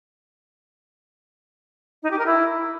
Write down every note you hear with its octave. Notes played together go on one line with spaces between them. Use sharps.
D#4
G4
A#4
E4